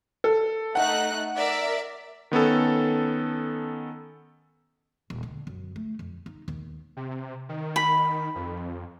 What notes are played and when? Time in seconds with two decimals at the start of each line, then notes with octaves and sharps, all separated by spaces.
0.24 A4
0.75 A3 D#4 F#5 F#6
1.36 A#4 D5 E5
2.31 D#3 B3 C#4 A4
5.10 D#1
5.23 D3
5.47 F#2
5.76 A3
5.99 F2
6.26 D#4
6.48 D#2
6.97 C3
7.49 D#3
7.76 B5
8.35 F2